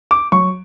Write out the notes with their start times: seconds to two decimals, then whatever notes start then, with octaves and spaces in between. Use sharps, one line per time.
0.11 D6
0.32 F#3 C#6